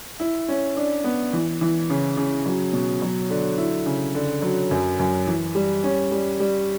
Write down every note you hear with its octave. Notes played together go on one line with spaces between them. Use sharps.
E4
C#4
D4
B3
E3
E3
C#3
C#3
F#3
B2
F#3
D3
E4
C#3
D3
F#3
F#2
F#2
E3
G3
C#4
G3
G3